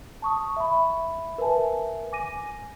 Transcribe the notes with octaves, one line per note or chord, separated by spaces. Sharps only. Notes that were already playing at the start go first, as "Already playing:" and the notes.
A5 C#6 D#6
E5 B5
A#4 B4 E5 G#5 A5
G#5 D6 A#6 D#7